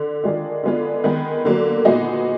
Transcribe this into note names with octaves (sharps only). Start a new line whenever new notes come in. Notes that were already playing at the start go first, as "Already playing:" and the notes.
Already playing: D3
D#3 G#3 D4 F4
D3 G#3 B3 D4 F4
D#3 G#3 B3
D3 F#3 A#3
A#2 G#3 B3 D#4 F#4